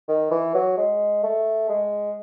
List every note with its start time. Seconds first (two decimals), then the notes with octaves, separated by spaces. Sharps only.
0.08 D#3
0.31 E3
0.54 F#3
0.77 G#3
1.24 A3
1.70 G#3